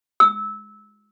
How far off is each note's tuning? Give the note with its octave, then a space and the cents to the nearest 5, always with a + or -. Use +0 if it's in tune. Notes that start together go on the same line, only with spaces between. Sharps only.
E6 -20